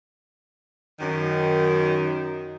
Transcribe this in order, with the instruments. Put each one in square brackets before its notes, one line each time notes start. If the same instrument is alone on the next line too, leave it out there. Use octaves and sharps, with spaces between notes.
[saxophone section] F#2 D#3